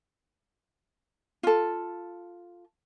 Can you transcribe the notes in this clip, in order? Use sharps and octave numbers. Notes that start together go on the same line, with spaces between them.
F4 A4